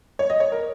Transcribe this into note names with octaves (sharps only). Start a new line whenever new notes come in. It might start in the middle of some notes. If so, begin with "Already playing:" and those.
C#5
D#5
C#5
A#4